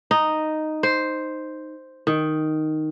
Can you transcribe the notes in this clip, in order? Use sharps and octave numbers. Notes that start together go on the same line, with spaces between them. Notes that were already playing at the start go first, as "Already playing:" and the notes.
D#4
C5
D#3